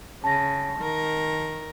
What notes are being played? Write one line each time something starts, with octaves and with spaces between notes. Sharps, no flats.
C#3 A5 A#6
D#3 A#4